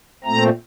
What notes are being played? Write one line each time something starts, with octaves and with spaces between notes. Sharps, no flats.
A#2 A3 C4 A#5